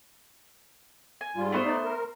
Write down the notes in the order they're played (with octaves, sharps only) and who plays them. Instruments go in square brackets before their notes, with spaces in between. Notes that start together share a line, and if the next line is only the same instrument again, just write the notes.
[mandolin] G#5
[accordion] G#2 G3 F4
[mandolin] A3 B3 C5
[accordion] D#4 D5
A#4